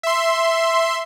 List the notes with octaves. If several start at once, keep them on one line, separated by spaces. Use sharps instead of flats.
E5 C6